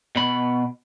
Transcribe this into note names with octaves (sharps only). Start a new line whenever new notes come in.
B2 B5